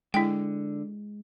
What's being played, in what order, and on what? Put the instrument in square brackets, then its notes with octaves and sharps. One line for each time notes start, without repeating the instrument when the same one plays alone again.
[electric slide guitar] D3 [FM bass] G#3 [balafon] E4 G5